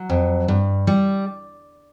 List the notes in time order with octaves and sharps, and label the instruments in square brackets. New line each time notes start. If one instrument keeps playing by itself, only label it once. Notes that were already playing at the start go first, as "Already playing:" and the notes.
Already playing: [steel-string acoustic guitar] F#3
F2
G2
G3